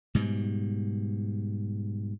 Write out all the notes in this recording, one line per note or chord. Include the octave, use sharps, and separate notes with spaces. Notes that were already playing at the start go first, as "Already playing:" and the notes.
G#2 B2 G3